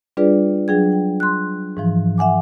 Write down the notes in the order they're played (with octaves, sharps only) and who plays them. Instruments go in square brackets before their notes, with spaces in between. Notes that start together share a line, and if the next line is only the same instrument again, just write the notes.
[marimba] G3 D4 F4 G#4 B4 D5
F#3 D4 G#4 G5 G#6
G5
C6 F#6
G#2 E3 F3
E5 F#5 G#5 D6